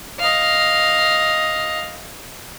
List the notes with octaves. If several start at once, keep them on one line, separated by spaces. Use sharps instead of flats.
D#5 F5